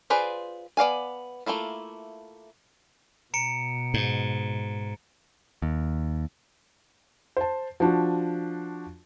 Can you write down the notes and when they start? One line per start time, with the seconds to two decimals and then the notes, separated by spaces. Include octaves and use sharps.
0.10 F4 G#4 B4 C5 D5
0.77 B3 D5 F5 G#5
1.46 A3 A#3 E4 F4
3.34 B2 A#5 C#7 D7
3.94 G#2
5.62 D#2
7.37 C5 A5
7.80 F3 D4 F#4